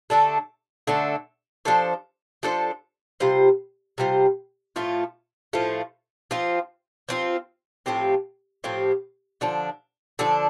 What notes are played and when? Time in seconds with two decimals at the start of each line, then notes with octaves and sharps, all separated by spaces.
0.10 D3 A3 D4 A4
0.87 D3 A3 D4 A4
1.65 F3 D4 A4 C5
2.43 F3 D4 A4 C5
3.20 C3 G3 F4 C5
3.98 C3 G3 F4 C5
4.76 A2 F3 A3 F4
5.53 A2 F3 A3 F4
6.31 F3 C4 F4
7.09 F3 C4 F4
7.86 A2 F3 C4 G4
8.64 A2 F3 C4 G4
9.41 D3 F3 D4
10.19 D3 F3 D4